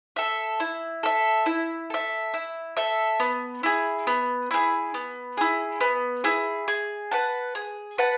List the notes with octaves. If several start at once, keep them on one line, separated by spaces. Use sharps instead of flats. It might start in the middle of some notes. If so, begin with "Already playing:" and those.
A4 E5
E4
A4 E5
E4
A4 E5
E4
A4 E5
B3
E4 G#4
B3
E4 G#4
B3
E4 G#4
B3
E4 G#4
G#4
B4 F#5 A5
G#4
B4 F#5 A5